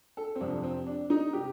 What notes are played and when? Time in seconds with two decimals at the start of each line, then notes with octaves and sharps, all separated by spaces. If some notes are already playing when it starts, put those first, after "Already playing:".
0.17 A4
0.35 C4
0.41 F2 C3 F3 D4
0.63 C4
0.87 D4
1.10 D#4
1.33 C3 G4